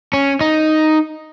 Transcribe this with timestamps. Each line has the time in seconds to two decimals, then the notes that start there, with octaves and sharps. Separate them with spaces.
0.13 C#4
0.41 D#4